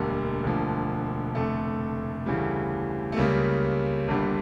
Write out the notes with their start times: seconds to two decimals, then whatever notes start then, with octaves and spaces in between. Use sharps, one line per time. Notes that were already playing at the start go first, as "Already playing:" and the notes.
Already playing: E1 D2 D3 G3 A#3
0.44 E1 D2 D3 F3
1.35 F1 F2 D3 A3
2.26 D2 C#3 E3 G3
3.12 A3
3.16 C#2 C#3 G3 A#3
4.08 G1 G2 D3 G3